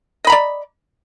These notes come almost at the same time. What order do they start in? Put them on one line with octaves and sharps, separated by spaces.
D#5 B5 A#5 D5